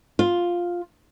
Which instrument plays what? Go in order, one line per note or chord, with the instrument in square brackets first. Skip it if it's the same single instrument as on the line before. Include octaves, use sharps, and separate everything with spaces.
[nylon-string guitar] F4